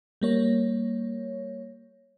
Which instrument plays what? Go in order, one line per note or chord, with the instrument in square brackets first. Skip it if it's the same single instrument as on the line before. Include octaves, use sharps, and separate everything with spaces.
[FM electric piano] G3 A#3 C#5